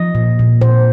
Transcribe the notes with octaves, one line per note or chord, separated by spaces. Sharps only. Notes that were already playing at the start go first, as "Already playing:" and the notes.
Already playing: F3 D#5
A#2
A#2
A#2 C5